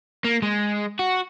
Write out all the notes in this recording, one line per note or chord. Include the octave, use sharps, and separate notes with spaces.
A#3
G#3
F#4